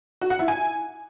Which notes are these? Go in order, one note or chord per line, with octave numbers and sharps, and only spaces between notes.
F#4
F#5
E4
G#5